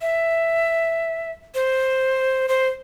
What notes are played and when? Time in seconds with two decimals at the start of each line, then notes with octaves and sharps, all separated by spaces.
0.01 E5
1.55 C5
2.48 C5